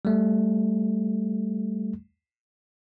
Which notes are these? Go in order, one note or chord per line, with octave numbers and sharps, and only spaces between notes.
G3 A3